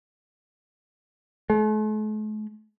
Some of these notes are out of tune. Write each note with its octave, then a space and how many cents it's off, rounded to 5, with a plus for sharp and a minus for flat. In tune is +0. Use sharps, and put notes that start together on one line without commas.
A3 -45